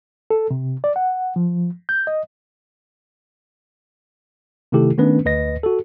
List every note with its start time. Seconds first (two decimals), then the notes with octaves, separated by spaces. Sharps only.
0.30 A4
0.51 C3
0.84 D5
0.96 F#5
1.36 F3
1.89 G6
2.07 D#5
4.72 C3 D#3 A3 E4 G4 A4
4.98 D#3 A3 B3 C#4 D4 B4
5.25 D2 B4 D#5 A#6
5.63 F#4 A4